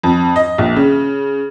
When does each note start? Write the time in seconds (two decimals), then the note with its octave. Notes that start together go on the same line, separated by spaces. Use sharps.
0.03 F2
0.36 D#5
0.58 A#1
0.76 C#3